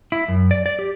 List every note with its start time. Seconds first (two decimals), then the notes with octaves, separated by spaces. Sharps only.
0.12 E4
0.28 F#2
0.51 D5
0.66 D5
0.79 G4